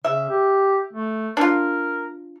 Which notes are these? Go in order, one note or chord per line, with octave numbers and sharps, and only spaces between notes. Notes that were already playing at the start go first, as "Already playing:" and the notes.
C#3 E5
G4
A3
D4 F4 A#4